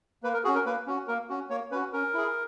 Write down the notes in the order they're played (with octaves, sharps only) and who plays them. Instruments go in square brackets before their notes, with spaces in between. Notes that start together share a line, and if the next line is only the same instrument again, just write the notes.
[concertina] A#3 B4
A#4
C#4 F#4 G#4
A#4
A#3 B4
C#4 F#4
A#3 A#4
C#4 F#4
A#3 C#5
C#4 F#4 B4
C#4 A#4
E4 G#4